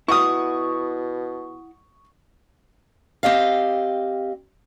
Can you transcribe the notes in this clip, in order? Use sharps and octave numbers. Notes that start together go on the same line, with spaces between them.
B2 E4 F#4 C#6 D#6
C4 G4 D#5 F5